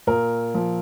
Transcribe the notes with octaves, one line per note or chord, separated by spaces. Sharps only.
A#2 A#4
F3